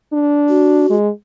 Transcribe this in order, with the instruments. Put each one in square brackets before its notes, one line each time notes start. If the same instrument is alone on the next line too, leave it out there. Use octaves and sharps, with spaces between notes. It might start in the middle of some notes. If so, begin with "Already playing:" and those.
[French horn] D4
[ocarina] F#4
[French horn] G#3